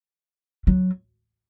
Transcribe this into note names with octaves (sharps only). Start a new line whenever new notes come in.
F#3